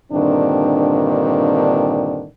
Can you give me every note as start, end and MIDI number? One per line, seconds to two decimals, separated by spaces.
0.12 2.26 43
0.12 2.26 46
0.12 2.26 50
0.12 2.26 51
0.12 2.26 60
0.12 2.26 62